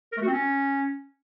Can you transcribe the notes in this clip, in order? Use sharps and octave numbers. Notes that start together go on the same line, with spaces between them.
A#4
A3
F#4
C4
C#4